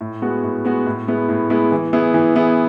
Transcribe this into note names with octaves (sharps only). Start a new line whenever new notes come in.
A2
G#3 B3 F#4
A2
G#3 B3 F#4
A2
G#3 B3 E4
A2
G#3 B3 E4
E3
B3 E4 G#4
E3
B3 E4 G#4